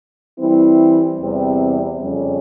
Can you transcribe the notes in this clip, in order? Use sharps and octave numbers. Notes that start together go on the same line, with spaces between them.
E3 G3 C4 E4
E2 C3 G3 C4
F2 C#3 G3 C#4